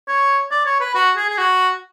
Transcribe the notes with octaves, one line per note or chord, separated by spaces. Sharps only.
C#5
D5
C#5
B4
F#4
G#4
G#4
F#4